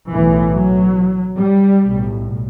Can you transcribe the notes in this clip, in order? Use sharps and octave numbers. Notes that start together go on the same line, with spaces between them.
B1 A2 E3
F#3
G3
B1 A2